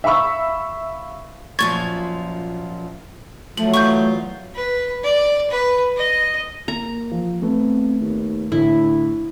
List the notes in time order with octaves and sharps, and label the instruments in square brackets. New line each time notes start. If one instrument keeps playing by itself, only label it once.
[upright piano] E5 F5 B5 C#6 E6
[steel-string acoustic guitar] F#2 A#2 F3 [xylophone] C#6 G#6 A6
[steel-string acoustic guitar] F3 [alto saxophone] F#3 [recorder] A3 [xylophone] F#7
[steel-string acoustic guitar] E2 F4 [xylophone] C#6 G6
[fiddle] B4
D5
B4
D#5
[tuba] A#3 [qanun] A#5
[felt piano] F3
[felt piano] A3 B3 [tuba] C4
[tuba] D#2
[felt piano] A2 [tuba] D3 [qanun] E4